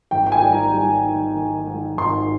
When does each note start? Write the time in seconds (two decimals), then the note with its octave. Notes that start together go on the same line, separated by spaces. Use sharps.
0.11 G#1 G5
0.26 G5
0.32 G#5
0.42 G3
0.53 A#5
0.74 G3
1.04 D#3
1.35 D#3
1.67 G#2
1.97 G#1 C6